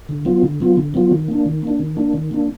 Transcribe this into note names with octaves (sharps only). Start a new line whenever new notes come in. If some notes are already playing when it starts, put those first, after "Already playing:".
D3
F#3 B3 F4
D3
F#3 B3 F4
D3
F#3 B3 F4
D#3
A#3 D4
D#3
A#3 D4
D#3
A#3 D4
D#3
A#3 D4